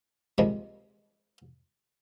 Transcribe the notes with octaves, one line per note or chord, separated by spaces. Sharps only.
C3 F3 G3 G#3 A#3